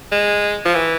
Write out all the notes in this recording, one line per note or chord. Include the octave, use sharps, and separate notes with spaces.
G#3
F3
E3